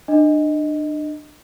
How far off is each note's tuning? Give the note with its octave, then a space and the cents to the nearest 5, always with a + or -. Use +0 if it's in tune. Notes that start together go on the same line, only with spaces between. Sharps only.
D4 +35 D#5 +5